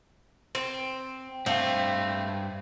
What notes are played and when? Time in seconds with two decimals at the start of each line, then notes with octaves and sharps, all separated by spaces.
0.55 C4
1.46 G2 A3 C4 F5